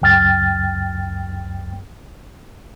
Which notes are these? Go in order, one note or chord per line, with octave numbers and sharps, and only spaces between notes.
C#2 F#2 G5 F6 A6